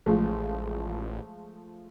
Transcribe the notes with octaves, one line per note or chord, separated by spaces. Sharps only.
A1 F3 G#3 A3